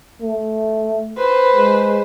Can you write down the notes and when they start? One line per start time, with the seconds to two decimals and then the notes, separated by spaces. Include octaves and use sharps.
0.22 A3
1.17 B4 C5
1.54 G#3